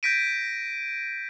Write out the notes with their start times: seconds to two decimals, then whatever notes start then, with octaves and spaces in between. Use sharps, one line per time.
0.03 G6 G#6 A#6 B6 D7 D#7